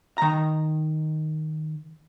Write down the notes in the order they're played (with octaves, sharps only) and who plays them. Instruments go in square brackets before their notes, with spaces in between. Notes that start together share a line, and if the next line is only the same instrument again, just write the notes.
[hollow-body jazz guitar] D#3 A#5